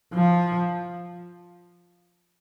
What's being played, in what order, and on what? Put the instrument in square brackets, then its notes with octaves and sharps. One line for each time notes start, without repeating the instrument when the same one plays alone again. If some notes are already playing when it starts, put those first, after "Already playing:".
[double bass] F3